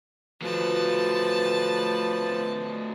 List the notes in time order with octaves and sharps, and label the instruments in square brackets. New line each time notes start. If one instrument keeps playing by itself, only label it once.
[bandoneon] F3 [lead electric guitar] F#3 A3 [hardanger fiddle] B4 A5